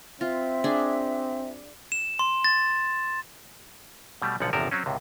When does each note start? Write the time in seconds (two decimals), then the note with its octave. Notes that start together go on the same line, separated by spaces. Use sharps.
0.21 C4 F4 E5
0.64 D4 G#4
1.92 E7
2.19 C6
2.45 A6
4.22 B2 G3 A3
4.40 B1 A#2 D3 F3 F#5
4.53 G1 E2 C3 F3 A#4 A5
4.71 F#3 C4 C#4
4.86 C#2 A2 C3